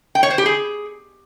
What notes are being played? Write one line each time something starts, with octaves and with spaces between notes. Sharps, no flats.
G5
C#5
C5
G4
G#4